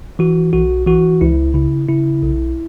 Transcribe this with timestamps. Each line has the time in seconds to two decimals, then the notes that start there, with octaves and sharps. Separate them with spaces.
0.19 E3 F#4
0.53 B1 F#4
0.87 E3 F#4
1.21 C#2 E4
1.54 C#3 E4
1.89 C#3 E4
2.23 B1